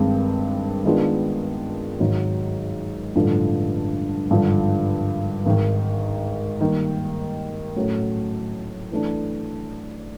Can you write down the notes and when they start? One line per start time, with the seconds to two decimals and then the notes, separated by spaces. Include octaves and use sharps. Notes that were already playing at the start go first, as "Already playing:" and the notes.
Already playing: G2 D#3 G#3 C4
0.85 D#3 G#3 B3 D4 F4
2.00 G#1 G#2 D#3 F#3
3.15 A1 G2 D3 F3 A3
4.30 G#1 G2 D3 F3
5.46 G#1 G#2 D#3
6.61 D#3 G3 A#3
7.76 A2 F#3 A3 C#4
8.91 E3 A3 D4